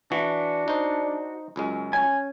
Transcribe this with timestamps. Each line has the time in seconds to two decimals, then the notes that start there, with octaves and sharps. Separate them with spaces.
0.12 E3 D4 F#4
0.68 D#4 C5
1.56 C#2 F#2 G#3
1.93 C#4 G#5